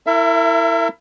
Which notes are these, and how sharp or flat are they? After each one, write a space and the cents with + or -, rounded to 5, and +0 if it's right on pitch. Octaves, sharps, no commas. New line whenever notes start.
E4 +0 A#4 -35 E5 +30